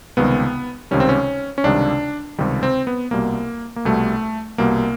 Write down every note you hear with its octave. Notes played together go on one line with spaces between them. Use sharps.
C#2 C3 D#3 G3 B3
C#2 C3 D#3 G3 C#4
C4
C#4
C#4
C#2 C3 D#3 G3 D4
C#2 C3 D#3 G3
C4
B3
C2 B2 G3 A#3
A#3
C2 B2 G3 A3
C2 B2 G3 A#3